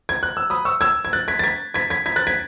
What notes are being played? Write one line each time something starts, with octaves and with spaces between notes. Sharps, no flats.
G#6
F#6
E6
B5 D#6
C#6 E6
E6 G#6
G#6
F#6 A6
G#6 B6
A6
G#6 B6
G#6 B6
G#6 B6
G#6 B6
F#6 A6
G#6 B6